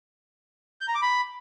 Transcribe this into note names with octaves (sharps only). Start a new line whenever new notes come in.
G6
A#5
D6
B5